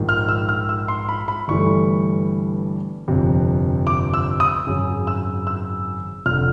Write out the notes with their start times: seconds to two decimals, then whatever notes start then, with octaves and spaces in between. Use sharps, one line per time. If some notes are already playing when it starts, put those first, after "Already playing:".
Already playing: A#1 G#2 D#3
0.09 F6
0.29 E6
0.49 F6
0.69 E6
0.88 C6
1.09 B5
1.28 B5
1.48 G1 G2 E3 A3 C#6
3.08 G1 F2 C3
3.87 D6
4.14 E6
4.40 D#6
4.67 G#1 F#2 C#3
5.07 E6
5.47 E6
6.26 F1 F6
6.31 D3